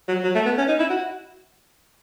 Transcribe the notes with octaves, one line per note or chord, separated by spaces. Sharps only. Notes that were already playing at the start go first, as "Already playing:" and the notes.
F#3
F#3
A3
B3
C#4
D#4
E4
F#4